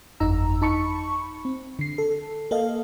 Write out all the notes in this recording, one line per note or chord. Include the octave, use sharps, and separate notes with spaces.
G1 F2 D#4 A#5 E6
D#4 A5 B5 C#6 C#7
C4
D3 C7
A4
A#3 A4 D#5 F5